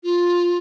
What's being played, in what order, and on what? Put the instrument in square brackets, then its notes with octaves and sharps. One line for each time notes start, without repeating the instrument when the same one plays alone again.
[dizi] F4